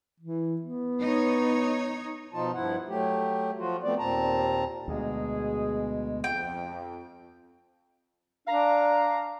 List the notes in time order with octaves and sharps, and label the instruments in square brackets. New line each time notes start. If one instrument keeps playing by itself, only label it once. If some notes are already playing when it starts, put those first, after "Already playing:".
[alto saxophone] E3
B3
[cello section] D#4 C#5
[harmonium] B2 F3 D#4 F4 A5
G2 F3 E4 F#5
F#3 A3 G4
F3 F4 F#4
F3 A3 B3 C4 D5
D#2 A#2 C4 A5 A#5
[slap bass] D2 [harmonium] B2 G#3 [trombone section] G#4
[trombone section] F2 [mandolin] G5
[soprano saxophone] D4 [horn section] F5 A#5